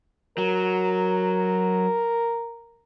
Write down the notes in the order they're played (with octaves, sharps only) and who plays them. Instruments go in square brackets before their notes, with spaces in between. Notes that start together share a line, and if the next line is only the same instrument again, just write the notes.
[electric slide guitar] F#3 [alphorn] A#4